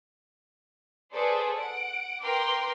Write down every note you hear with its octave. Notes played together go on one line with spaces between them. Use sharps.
G#4 A4 B4 C5 D5
F#5 D7
A#4 B4 G5 C6 D6